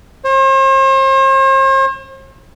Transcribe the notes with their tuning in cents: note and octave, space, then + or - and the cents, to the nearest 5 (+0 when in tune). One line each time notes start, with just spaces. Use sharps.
C5 +45